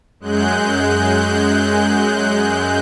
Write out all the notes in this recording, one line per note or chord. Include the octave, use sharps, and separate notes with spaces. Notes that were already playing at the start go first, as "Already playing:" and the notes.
F#2 G#3 F#6 G6